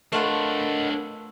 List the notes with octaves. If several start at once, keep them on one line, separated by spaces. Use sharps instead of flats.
A3 D4 F4 A#4 B4 C#5 D#5 F#5